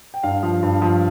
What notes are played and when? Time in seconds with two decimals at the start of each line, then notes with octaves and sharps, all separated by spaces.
0.14 G5
0.23 G2 F5
0.43 F3
0.63 G2
0.82 F3